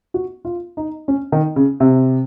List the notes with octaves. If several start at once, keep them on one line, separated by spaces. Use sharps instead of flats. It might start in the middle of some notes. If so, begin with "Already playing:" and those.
F#4
F4
D#4
C#4
D#3
C#3
C3